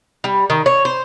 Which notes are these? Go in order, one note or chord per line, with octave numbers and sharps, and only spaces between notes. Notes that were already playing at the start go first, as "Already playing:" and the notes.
G3
D#3
C#5
C5